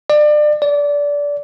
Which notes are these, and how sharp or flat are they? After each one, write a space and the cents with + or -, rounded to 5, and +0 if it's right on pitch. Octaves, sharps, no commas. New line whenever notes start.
D5 +30
D5 -20